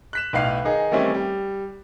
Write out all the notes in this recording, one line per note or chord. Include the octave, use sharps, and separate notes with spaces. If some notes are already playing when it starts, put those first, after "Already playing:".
F#6 B6 E7
B1 A2 B4 F5 C7 F7
D#3 D#4 G#4
D#3 E3 G3 A3 C4 C#4
G3